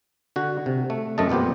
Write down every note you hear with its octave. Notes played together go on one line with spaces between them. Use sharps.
D3 F#4
C3
A3
F#2 A3 C4 D#5 A5
F2 A#2 B3 G4 C5